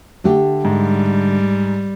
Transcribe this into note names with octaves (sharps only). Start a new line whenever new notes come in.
D3 A3 G4
G#2 G3